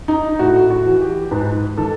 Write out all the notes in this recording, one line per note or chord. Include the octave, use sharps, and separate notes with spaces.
D#4
A2 F#4
F#4
E3
G4
G#2 B4
D#3 A4